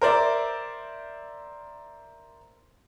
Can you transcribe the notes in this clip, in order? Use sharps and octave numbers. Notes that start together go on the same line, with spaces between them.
A#4 C5 D5 E5